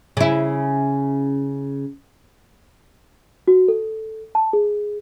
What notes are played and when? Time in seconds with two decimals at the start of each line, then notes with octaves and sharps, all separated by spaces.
0.17 C#3 E4
3.48 F#4
3.68 A4
4.35 A5
4.53 G#4